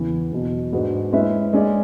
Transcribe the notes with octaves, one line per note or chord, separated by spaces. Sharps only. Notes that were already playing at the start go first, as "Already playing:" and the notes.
Already playing: E2 C#3 E3 B3
E2 B2 F#3
G#2 G#3 D4 F#4 B4
G#3 C#4 E4 B4 E5
G#3 C#4 G#4 D5